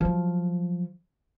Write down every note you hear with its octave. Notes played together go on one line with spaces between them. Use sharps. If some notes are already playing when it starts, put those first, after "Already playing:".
F3 F#3